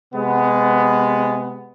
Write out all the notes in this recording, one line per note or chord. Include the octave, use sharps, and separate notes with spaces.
C3 G#3 B3